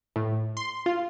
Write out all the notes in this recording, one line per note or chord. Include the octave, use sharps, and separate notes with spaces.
A2
C6
F4